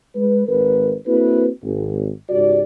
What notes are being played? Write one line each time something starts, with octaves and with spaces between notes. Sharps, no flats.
G#3 B4
G#1 A#4 B4
A#3 C4 E4 F#4 A4 B4
G#1
C#2 G#2 F#4 G4 D5